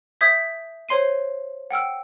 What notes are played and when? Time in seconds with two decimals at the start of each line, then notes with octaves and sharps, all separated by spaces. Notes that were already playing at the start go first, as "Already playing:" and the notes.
0.21 E5 D#6 G6 G#6 B6
0.89 C5 C#5 C6 C7 D#7
1.71 F#5 G5 E6 F6